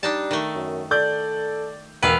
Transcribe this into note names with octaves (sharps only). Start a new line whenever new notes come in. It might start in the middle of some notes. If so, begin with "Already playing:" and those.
G3 D4 D#4 A5
D#3 A3
F#2
A4 D5 G6
E1 A#3 B4 F5